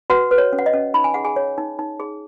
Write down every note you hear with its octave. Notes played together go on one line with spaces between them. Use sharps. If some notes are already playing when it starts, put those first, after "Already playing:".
F#4 B4 F#5
B4
C#5
C#4
F#5
D#5
C#4
D#4 B5
G#5
G#4 F#5
G#4 G#5
C#5
D#4
D#4
G#4